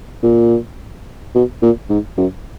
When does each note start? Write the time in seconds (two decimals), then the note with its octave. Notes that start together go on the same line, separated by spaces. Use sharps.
0.23 A#2
1.35 B2
1.62 A#2
1.90 G#2
2.17 F#2